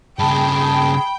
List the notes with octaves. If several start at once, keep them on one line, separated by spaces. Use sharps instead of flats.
G2 C#3 G#4 G5 A5 B5